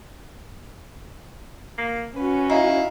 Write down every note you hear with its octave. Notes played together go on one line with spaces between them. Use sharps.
A#3
C#4 F#4 B4
D#4 E4 F5